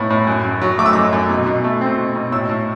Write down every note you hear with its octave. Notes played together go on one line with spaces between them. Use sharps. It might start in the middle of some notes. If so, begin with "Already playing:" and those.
Already playing: A2 B3 B5
A2
F#2
F#2
F#3
A3 D6
E6
F#2 D6
F#2
B2
B2
A3
C4
B2
B2
A2 E6
A2